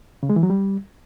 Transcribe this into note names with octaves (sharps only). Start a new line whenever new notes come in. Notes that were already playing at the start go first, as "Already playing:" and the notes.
C#3
G#3
E3
F#3
G3